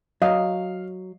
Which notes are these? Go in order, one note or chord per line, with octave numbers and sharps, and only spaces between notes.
F#3 D#5 F5